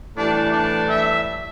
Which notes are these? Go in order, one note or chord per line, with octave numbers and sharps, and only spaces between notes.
A2 E3 G3 D4
D4
E5